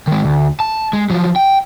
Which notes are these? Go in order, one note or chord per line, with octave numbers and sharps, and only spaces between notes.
D#3 G#3
D2
A5
G#3
F3 F#3
G5